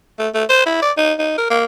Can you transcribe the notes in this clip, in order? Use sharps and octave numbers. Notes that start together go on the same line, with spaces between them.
A3
A3
C5
E4
D5
D#4
D#4
A#4
A#3